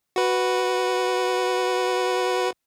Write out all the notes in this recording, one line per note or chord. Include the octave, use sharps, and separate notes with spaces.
F#4 B4